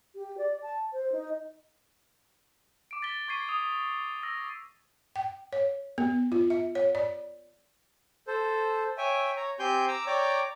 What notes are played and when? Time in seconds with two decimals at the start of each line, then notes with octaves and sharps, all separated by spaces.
0.15 G4
0.38 D5
0.62 A5
0.93 C5
1.12 D#4
2.91 D6 D7
3.02 A6 B6 G7
3.28 C#6 G#6 B6 C7 D#7
3.49 D#6 F7
4.23 E6 A#6
5.16 G5
5.53 C#5
5.98 B3
6.32 F4
6.50 E5
6.75 C#5
6.95 D5
8.28 A4 C5
8.98 C#5 E5 G5 G#5
9.37 C#5 A#5
9.59 C4 G4 G5 G#5 C6 G6
9.88 A#5 D6 E6
10.06 C#5 D5 G5 A#5 D6